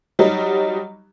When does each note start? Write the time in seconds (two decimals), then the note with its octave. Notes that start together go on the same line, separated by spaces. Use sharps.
0.19 F#3 G3 D#4